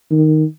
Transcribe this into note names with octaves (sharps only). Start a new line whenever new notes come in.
D#3